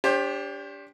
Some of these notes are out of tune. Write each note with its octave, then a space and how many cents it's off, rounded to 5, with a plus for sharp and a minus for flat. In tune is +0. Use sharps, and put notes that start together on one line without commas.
D4 -30 G4 +15 C5 +30